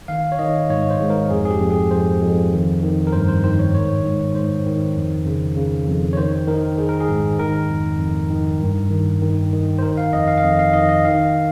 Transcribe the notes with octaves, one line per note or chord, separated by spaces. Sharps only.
D#3 F5
C#5
D#3 D#5
G#2 C#5
C5
G#2
A#4
F2 G#4
G#4
G4
F2
G#4
F2 C5
F2
D#3
D#3
A#4
G2 C5
C5
D#3 C5
C#5
G#2 C#5
G#2
G#2 C5
D#3
F2
C#3
C#3
F2
C#5
D#3 C5
D#3 A#4
D#3 G#4
A#4
G#4
G#2
D#3 A#4
F2
F2
D#3
G2
D#3
D#3
D#3
C5
D#3 A#4
F5
F2 D#5
F5
F5
F2 D#5
F5
D#3 D#5
D#5
D#3 F5